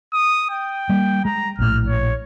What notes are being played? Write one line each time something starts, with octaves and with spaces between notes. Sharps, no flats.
D#6
G5
G3 A#3
G#3 A#5
A#1 A2 F6
C#5